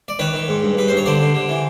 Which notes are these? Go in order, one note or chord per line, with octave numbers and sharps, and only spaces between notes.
D5
D#3 B4 C#5
D#3
G#2
G2
G2 B4
G2 C5
C#5
D3 C5 D5
D3
D3
E3